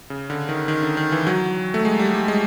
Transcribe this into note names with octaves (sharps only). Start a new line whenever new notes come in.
C#3
D3
D#3
D#3
D3
D#3
E3
F#3
A3
G#3
G3
G3
G#3